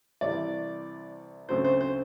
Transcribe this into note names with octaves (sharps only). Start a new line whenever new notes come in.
C2 C3 E3 D5
D2 C#3 F#3 A3 C4 C5
C5
C5